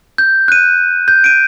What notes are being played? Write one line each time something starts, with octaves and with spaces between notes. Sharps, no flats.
G6
F#6 D#7
G6
D7 D#7